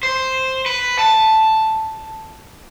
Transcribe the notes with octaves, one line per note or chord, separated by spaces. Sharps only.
C5
B4
A5